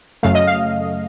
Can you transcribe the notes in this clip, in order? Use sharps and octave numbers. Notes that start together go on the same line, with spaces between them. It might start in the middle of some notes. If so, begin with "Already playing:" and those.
F#2 C#3 F#3 A3 F5
D#5
F5